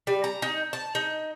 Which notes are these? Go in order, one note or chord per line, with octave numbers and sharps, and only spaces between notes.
G3
A#5
D#4
A5
D#4